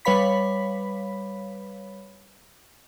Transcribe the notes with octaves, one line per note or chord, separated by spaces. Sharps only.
G3 B4 C#5 F5 B5 B6